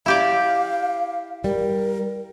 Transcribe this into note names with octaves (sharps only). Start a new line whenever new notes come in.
E4 G4 D5 F5
G3 A#4